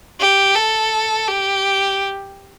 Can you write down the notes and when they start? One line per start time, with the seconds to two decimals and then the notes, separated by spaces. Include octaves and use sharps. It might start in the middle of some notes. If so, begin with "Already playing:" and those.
0.20 G4
0.55 A4
1.28 G4